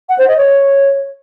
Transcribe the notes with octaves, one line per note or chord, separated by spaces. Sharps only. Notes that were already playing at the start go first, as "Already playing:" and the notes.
F#5
C5
D#5
C#5